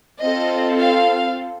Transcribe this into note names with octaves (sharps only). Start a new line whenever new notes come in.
C4 F4 A4 D#5
F5